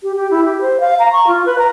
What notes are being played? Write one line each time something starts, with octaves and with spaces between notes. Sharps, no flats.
G4
G4
E4
G4
C5
F5
A#5
C#6
F4
B4
A#5